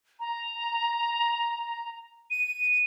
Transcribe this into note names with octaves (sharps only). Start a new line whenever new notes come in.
A#5
D#7